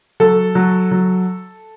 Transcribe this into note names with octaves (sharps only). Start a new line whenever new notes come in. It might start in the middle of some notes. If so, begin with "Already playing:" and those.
F#3 A4
F#3
F#3